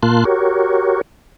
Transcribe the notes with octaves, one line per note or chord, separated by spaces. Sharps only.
A#2 A#3 F4 A5 C6 F#6
F#4 G4 A#4 C#5